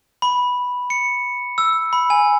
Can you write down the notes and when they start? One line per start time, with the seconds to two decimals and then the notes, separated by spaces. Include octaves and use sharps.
0.22 B5
0.90 C#7
1.58 E6
1.93 B5
2.10 G#5